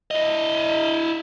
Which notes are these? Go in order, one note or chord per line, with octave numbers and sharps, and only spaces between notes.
E4 D#5